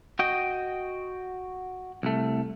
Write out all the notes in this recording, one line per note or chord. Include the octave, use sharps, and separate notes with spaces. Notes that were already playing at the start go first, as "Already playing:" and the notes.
F#4 D#5 G5
C2 A3